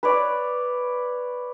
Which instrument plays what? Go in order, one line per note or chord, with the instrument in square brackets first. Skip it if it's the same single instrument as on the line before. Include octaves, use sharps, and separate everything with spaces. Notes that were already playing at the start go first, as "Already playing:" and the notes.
[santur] B4 C#5 D5